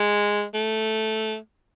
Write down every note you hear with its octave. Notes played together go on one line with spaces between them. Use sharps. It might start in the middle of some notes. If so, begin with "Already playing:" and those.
Already playing: G#3
A3